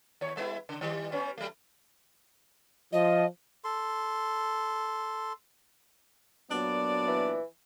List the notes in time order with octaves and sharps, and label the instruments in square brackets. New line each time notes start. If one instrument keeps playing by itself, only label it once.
[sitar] D#2 C#5
G3 B3 E4
C#3
D#3 G3
G3 B3 C#4
F#3 A3
[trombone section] F3 [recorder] D#5
[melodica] A4 C6
[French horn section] A#2 F#3 B3 [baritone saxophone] D4 [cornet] D5
[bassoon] E3